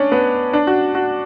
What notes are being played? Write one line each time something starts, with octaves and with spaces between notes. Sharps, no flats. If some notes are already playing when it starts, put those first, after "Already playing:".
Already playing: C#4 D4
B3
D4
F#4
F#4